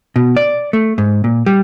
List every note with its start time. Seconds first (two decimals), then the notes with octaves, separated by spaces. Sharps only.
0.16 B2
0.37 D5
0.73 A3
0.98 G#2
1.24 A#2
1.46 G3